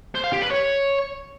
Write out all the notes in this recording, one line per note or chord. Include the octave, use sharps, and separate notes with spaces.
C5
F5
G4
B4
C#5